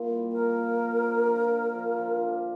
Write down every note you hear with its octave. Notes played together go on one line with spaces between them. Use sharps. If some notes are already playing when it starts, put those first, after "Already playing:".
Already playing: A#2 A#3 E4
G3
F3 A#4
F3
F3
D3
F3
D3
F3
F3
D4